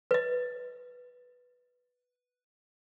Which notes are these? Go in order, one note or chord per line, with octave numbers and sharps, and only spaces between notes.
B4 D#5